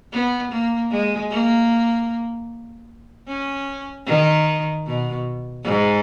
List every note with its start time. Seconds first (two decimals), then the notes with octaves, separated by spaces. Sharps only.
0.12 B3
0.52 A#3
0.91 G#3
1.31 A#3
3.28 C#4
4.07 D#3
4.86 B2
5.64 G#2